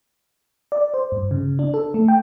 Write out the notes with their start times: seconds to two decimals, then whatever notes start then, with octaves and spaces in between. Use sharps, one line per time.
0.72 D5
0.94 C5
1.12 G2
1.31 C#3
1.59 D4
1.74 A4
1.94 A3
2.08 G5